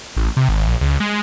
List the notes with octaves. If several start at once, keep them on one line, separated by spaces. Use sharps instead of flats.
A1
C3
G#1
A#1
C#2
G#3